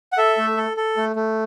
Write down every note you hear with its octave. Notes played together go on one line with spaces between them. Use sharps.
F#5
A4 E5
A3
A4
A4
A3
A3